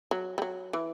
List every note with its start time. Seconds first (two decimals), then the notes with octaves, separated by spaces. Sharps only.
0.11 F#3
0.38 G3
0.42 F#3
0.73 E3